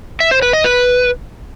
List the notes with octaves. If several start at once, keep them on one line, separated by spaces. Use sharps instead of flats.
E5
C5
B4
D#5
B4